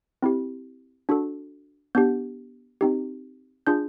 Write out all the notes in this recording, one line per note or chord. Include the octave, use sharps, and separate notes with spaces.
C4 E4 G4
D4 F#4 A4
B3 D4 G4 G6
C4 D#4 G4
D4 F4 G#4 G6